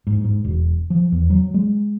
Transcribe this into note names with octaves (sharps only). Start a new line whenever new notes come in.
G#2
G#2
E1
F3
E2
F#3
G#3